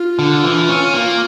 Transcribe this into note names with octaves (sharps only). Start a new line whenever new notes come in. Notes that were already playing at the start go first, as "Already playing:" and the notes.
Already playing: F4
D3
E3
C#4
A#3